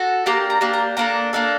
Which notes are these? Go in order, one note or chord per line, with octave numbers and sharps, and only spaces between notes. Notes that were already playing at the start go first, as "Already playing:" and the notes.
Already playing: F#4 A4
A#3 D4 G4 A#5
A#5
A#3 D4 G4
A#5
A#3 D4 A4 A#5
A#3 D4 A4